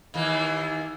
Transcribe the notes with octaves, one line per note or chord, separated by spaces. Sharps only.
D#2 E3 A#3